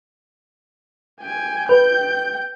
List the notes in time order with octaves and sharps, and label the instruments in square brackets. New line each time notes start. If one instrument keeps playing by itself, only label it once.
[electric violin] G5 G#5
[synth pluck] B4 [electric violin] G5 G6